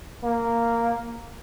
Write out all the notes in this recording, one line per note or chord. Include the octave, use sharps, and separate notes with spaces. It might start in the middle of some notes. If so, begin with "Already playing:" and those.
A#3